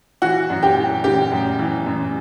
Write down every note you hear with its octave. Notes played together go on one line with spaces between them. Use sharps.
E3 F#4 F#5
F#2
G4 G5
E3
C#3 G4 G5
F#2
E3
F#2